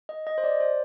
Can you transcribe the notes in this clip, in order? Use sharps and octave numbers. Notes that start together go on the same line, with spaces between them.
D#5
D#5
C5
D5
C5